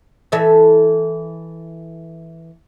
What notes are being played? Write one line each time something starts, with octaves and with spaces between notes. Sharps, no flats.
E3 A4 E5